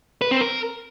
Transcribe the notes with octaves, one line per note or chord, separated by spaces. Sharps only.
B4
C4
A#4